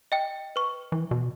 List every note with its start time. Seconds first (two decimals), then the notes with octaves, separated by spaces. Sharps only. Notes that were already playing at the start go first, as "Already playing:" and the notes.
0.12 D#5 G5
0.56 B4 C#6
0.92 E3
1.11 B2